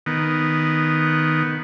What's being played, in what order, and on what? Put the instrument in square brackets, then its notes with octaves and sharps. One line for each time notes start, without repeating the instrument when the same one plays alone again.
[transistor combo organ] D#3 B3